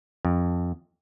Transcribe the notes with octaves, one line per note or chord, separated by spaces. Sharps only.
F2